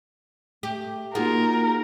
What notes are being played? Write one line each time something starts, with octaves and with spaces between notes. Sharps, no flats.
A3 G4
A#3 D#4 F4 F#4 G#4 A#4 F#5